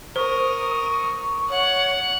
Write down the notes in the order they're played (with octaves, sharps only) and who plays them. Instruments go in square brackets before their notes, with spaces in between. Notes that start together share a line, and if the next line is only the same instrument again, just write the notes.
[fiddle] A#4 [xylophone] C5 [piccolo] C#6 [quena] D#6
[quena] C#5 [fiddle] F#5